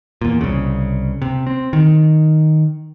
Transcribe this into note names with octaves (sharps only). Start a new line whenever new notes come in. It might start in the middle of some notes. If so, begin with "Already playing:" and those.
E2 A#2
C2 C#3
C3
C4
D#3